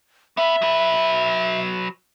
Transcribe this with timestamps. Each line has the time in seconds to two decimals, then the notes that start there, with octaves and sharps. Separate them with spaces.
0.37 B3 B4 E5
0.62 F#3 B4